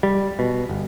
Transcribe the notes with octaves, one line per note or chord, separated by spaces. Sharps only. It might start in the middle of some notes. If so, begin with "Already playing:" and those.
G3
B2
G1